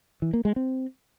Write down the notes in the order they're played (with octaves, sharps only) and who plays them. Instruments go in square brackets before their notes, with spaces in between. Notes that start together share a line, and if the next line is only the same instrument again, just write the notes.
[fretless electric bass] E3
A#3
G#3
C4